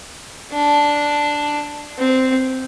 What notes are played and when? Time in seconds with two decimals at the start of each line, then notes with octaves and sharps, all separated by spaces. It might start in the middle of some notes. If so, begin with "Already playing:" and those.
0.53 D4
1.99 C4